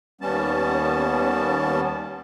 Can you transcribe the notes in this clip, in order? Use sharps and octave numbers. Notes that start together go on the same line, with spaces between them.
D#2 G3 B3 C#4 A5